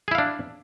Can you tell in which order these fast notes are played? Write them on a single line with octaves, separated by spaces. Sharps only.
G#4 E4 F5 D4